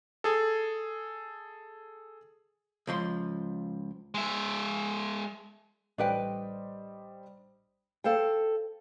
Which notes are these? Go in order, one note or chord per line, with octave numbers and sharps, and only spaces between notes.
G#4 A4
C#2 F3 C6
G#3 E5
A1 G3 D4 B4 C5 D#5 G5
A4 C5 F5 G5